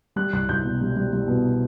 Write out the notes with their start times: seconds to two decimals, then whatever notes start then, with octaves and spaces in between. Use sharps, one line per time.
0.16 G3 F#6
0.33 C2 F#6
0.49 C2 G6
0.64 B2
0.81 G3
0.96 G3
1.13 G3
1.28 B2